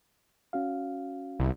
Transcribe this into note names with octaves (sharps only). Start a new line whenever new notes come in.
C#4 F#4 F5
C2